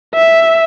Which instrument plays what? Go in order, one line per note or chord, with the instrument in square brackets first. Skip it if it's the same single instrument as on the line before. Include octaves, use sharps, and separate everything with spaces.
[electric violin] E5